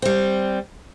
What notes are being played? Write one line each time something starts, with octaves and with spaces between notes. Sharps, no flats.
G3 C4